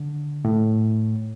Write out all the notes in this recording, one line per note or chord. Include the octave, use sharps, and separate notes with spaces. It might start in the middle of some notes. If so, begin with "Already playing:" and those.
Already playing: D3
A2